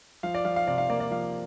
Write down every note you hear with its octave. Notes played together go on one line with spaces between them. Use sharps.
F3 F5
D5
F3 F5
F5
C3 D5
F5
A#3 D5
D5
F3 F5